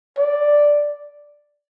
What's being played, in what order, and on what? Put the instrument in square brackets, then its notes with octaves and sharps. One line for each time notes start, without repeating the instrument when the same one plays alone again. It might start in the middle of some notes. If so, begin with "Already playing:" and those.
[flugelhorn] D5